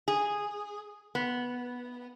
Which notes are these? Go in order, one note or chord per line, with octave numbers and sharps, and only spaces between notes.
G#4
B3